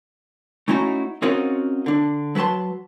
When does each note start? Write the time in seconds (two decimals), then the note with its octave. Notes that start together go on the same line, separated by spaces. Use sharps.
0.68 A3 C#4 D#4 E4 F#4
1.22 C4 C#4 D#4 F4 F#4 A#4
1.86 D3 D4
2.35 F#3 B4 F#5 A5 C6